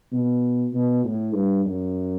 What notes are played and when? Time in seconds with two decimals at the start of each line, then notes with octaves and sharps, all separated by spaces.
0.12 B2
0.73 B2
1.04 A2
1.34 G2
1.65 F#2